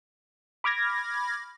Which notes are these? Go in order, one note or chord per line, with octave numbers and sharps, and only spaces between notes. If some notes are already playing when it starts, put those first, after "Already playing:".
B5 D6 F6 G#6 A#6